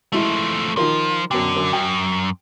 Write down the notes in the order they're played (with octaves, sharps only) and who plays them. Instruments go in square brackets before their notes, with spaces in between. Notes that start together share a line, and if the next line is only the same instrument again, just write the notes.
[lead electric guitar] F3 A3 [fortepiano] G#3 E4
[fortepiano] D#3 F4 A#4 [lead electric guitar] F3
[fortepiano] F#2 B2 G5 [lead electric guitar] D3
[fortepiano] F#2
[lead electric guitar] F#2 [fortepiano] G5